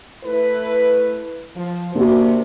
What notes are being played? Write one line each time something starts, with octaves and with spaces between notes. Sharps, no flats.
A3 E4 B4
F3
C3 A#3 D4 F#4